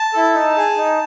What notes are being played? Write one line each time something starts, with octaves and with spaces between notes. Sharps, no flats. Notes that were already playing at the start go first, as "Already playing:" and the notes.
Already playing: A5
E4 A4
D#4
G#4
D#4